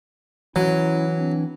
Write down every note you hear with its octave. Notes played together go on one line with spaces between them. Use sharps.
E3 F#3 C#4 E4
C4 D4